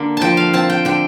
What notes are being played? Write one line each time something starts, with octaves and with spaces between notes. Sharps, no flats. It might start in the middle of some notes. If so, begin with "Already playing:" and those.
Already playing: D3 A#3
F3 G5 A5
F5
C4 A5
G5
D3 G5